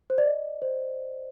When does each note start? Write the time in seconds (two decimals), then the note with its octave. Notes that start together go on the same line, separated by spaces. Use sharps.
0.10 C5
0.18 D5
0.26 D#5
0.62 C5